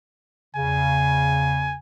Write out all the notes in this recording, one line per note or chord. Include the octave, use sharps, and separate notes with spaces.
E2 C#3 G#5